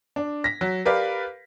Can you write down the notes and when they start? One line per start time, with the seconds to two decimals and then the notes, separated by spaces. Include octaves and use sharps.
0.16 D4
0.44 A#6 B6
0.61 F#3
0.85 G4 A#4 B4 D5 F5